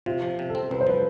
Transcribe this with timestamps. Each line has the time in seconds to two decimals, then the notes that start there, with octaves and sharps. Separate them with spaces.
0.06 C3 F4
0.22 F3
0.39 C3
0.49 A4
0.55 C4
0.71 C2 B4
0.81 C5
0.87 F3 B4